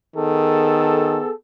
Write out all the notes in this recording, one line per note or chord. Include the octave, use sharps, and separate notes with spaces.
D#3 B3 G#4 A4